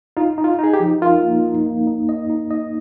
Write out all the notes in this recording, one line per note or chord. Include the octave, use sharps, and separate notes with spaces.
D#4 F4
D#4
F4
D#4 G#4
G4
F3
F4 A#4
A#3
D#4
A#3
D#4
D#5
D#4
D#5